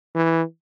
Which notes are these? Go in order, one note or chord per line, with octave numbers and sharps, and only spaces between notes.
E3